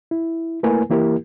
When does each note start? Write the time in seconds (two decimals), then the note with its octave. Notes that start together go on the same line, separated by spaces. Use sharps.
0.11 E4
0.63 A3 A#3 E4 A#4 B4 G#5
0.90 E3 A#3 E4 G4 A#4